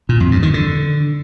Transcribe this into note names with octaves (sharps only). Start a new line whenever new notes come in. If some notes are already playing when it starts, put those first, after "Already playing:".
A#2
F2
G2
D#3
D3